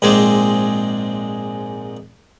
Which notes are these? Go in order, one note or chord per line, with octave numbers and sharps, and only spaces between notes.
A#1 G#2 G#3 C4 G#4 D6